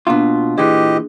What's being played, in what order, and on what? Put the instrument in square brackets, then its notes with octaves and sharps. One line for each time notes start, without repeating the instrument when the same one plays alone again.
[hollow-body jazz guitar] B2 F4 [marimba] A#3 D4
[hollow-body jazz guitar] A#2 E3 [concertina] G4 D#5 [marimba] G#4